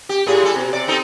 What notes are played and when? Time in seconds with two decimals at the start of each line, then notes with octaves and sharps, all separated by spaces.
0.09 G4
0.26 A2 G#4
0.43 G3 A4
0.55 B2
0.72 C3 D5
0.87 C4 D#4 A4